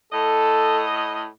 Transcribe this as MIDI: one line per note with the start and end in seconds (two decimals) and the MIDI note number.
0.13 1.26 45
0.13 0.87 69
0.13 1.26 75